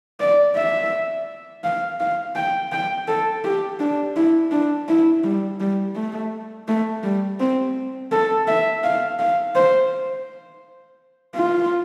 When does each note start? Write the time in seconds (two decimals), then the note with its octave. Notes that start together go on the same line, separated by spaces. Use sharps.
0.20 D5
0.56 E5
1.64 F5
2.00 F5
2.36 G5
2.72 G5
3.08 A4
3.44 G4
3.80 D4
4.16 E4
4.52 D4
4.89 E4
5.24 G3
5.60 G3
5.96 A3
6.68 A3
7.04 G3
7.40 C4
8.12 A4
8.48 E5
8.84 F5
9.19 F5
9.56 C5
11.36 F4